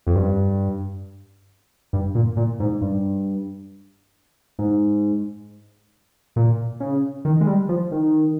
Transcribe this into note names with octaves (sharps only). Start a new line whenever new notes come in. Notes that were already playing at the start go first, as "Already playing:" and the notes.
F2
G2
G2
A#2
A#2
G#2
G2
G#2
A#2
C#3
D#3
G#3
G3
F3
D#3